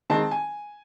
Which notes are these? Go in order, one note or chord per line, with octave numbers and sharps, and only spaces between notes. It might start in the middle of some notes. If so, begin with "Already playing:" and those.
D#3 G#3 C4 D#4 A5
G#5